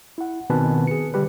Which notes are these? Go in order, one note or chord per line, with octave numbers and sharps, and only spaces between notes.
E4 F#5
B2 D#3 C4 B4 G#5 A5
G#4 C#7
D3 G3 G4 B4